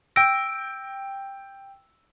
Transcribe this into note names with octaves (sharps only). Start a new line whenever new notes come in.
G5 E6 A#6 D7